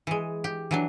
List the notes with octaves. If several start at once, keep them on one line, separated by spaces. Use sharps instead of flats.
E3 G#3
G4
E3 F#3 D4